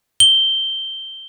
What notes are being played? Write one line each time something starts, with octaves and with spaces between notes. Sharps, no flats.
G7